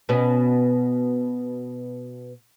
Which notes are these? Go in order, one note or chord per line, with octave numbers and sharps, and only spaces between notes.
B2 B3 C#4